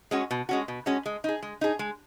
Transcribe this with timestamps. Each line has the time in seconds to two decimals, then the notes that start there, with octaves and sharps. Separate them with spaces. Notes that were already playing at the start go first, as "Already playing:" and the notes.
0.11 G#3 C#4 F#4
0.31 B2
0.49 G#3 C#4 F#4
0.68 B2
0.86 G#3 C#4 F#4
1.06 G#3
1.24 D#4 G#4
1.42 G#3
1.61 D#4 G#4
1.79 G#3